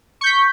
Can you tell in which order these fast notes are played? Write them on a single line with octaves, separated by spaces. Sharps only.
C#6 G6 B6